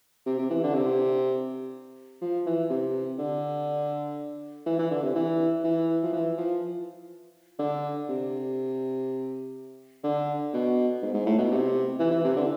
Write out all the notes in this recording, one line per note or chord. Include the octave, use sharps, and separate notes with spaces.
C3
C3
E3
D3
C3
F3
E3
C3
D3
E3
E3
D3
C3
E3
E3
F3
E3
F3
D3
C3
D3
B2
G#2
G#2
A2
B2
C3
E3
E3
C3
D3